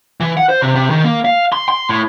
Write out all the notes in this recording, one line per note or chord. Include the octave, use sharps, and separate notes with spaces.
E3
F#5
C5
C3
C3
D#3
A#3
F5
C6
C6
A2